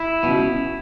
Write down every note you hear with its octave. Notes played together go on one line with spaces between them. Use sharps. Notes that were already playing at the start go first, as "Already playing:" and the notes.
Already playing: E4
C#2 B2